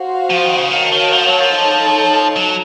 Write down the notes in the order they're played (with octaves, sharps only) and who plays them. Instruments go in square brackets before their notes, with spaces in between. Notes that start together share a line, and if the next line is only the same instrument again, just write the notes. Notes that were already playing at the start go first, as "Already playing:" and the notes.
Already playing: [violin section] F#4 C5 F5
[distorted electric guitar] F3
D#3
C#3
[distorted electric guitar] D#3 [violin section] F#4 A#4 C#5 F5 A5
[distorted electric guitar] D#3
F3
F#3
F3
[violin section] D#4 A4 C#5 A5
[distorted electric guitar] F#3